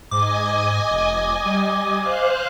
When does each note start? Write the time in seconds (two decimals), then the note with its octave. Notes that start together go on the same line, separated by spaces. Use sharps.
0.11 G#2 D#5 G#5 D6
0.91 F1
1.45 G3
2.00 C5 F5 F#6